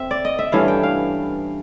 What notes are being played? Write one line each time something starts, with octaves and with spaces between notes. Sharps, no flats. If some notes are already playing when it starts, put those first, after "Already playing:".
Already playing: C4 E5
D5
D#5
E5
G2 E3 A3 C#4 F5
G5
F5